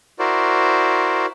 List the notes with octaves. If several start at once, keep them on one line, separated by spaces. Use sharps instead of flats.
E4 F#4 A#4 C5 D5